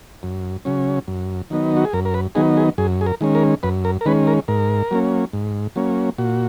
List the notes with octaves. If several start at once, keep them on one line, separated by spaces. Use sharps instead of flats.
F#2
C#3 F#3 C#4
F#2
D#3 F#3 B3 D#4
F#4
G#4
F#2 A#4
A#4
B4
D#3 F#3 B3 D#4 G#4
G#4
F#2 G#4
G#4
A#4
D#3 G#3 C#4
A#4
F#2 B4
A#4
A#4
D#3 G#3 C#4 B4
A#4
G#2 A#4
F#3 A#3 C#4
G#2
F#3 A#3 C#4
A#2 F#4